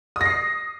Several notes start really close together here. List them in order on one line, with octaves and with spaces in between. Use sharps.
D#6 A#6 C7